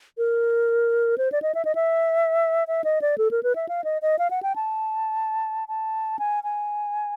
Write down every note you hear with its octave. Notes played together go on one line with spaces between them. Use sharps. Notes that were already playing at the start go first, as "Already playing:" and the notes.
A#4
C5
D5
D#5
E5
D#5
E5
E5
D#5
D5
A4
A#4
B4
E5
F5
D#5
D#5
F5
F#5
G5
A5
A5
G#5
G#5